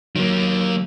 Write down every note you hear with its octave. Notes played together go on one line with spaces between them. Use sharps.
D#3 F#3 A#3